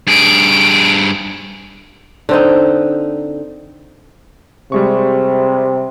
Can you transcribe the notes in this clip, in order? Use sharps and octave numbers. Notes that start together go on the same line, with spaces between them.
G2 G#4 D7
D3 C4 D#4
C3 G3 G#3 C#6